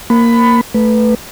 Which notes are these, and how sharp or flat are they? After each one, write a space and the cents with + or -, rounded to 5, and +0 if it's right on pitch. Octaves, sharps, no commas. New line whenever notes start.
A#3 +0 B5 +15
A3 +0 B4 +0